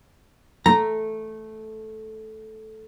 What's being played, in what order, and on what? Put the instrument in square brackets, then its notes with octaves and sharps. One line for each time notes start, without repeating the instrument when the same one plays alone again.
[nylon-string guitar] A3 [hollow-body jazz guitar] A#5